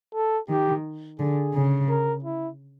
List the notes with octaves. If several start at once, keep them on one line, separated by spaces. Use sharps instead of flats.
A4
D#3 G4
D3 G#4
C#3
A#4
E4